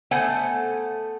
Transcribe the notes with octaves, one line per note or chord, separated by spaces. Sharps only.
A3 B3 A4 C5 F#5 G#5